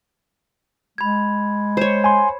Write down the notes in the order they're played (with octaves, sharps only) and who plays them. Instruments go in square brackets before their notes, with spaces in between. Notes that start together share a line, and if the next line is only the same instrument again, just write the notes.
[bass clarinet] G#3 [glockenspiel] B5 G#6
[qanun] C5 C#5
[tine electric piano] G#5 C6